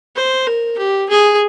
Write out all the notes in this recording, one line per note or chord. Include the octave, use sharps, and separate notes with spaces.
C5
A#4
G4
G#4